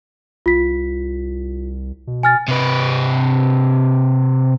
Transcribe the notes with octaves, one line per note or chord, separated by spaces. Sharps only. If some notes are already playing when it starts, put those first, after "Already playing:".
C2 F4 B6
B2
G#5 F6 A6
C3 B4